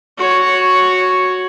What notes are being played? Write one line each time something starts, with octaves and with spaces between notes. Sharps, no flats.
F#4 C#5